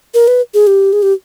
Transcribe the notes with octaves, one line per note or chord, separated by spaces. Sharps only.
A#4
B4
G#4
G4
G#4
G4